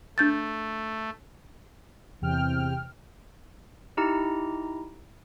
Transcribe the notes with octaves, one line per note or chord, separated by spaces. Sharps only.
A3 D4 G6 A6
E2 C3 G5 F6
D#4 E4 G4 A#5